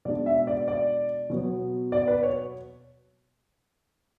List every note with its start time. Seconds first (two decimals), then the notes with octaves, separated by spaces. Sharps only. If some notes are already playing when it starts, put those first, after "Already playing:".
0.05 B2 G#3 D4 D5
0.26 E5
0.47 D5
0.68 D5
1.30 B2 F#3 B3
1.92 D5
2.08 B4
2.23 C#5